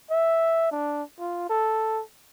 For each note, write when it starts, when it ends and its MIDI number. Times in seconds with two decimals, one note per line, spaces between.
0.11 0.69 76
0.71 1.03 62
1.19 1.47 65
1.49 2.02 69